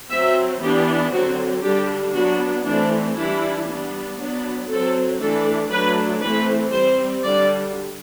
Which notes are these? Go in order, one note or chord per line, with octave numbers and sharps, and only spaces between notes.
F#3 C4 E5
E3 B3 D4 G4
D3 F#3 C4 F#4
D3 G3 D4 G4
F#3 B3 D4 F#4
E3 A3 C4 D4
E3 G3 D4 E4
G3 B3 D4
F#3 B3 D4
F#3 C4 A4
E3 A3 D4 A4
F#3 A3 D4 B4
E3 A3 C4 B4
G3 C4 C5
D3 G3 D4 D5